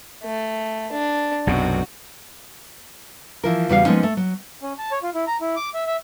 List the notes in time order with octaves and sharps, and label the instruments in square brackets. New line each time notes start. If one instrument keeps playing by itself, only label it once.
[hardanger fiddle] A3
D4
[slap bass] B1 F#2 C3 [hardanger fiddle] F#4
[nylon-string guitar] E3 F3 A#4
E2 C#3 G3 F#4 C5 F5
F3 G#3 A#3 B3 C#4 D#4
A3
F#3
[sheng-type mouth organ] C#4
A5
C#5
F4
E4
A#5
E4
D6
E5
E5